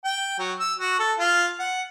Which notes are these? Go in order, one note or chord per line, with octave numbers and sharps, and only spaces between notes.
G5
F#3
E6
F#4
A4
F4
F#5